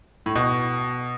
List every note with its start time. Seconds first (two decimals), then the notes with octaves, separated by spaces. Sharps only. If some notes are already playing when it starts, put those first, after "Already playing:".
0.26 A2
0.36 B2